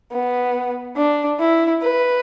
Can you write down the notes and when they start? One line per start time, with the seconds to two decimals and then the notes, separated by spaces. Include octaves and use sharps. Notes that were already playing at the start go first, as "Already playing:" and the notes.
0.12 B3
0.96 D4
1.39 E4
1.82 B4